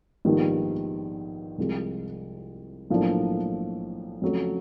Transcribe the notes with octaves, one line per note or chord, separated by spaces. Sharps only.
A#1 G#2 D#3 G3 B3
C2 C3 F3 G#3
B1 A2 F3 A#3 D4
F2 C#3 F#3 A3